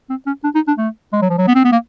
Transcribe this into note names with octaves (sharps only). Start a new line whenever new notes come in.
C4
C#4
D4
D#4
D4
A3
G#3
F#3
F3
F#3
B3
C4
B3
A#3